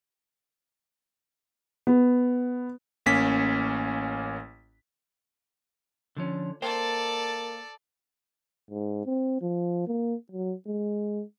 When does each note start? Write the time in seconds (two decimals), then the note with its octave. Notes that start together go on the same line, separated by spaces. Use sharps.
1.87 B3
3.06 A1 A#3 C#4 B6
6.17 D3 F3 C#4
6.62 A#3 A4 C5 D5 G5
8.71 G#2
9.06 C4
9.41 F3
9.87 A#3
10.32 F#3
10.67 G#3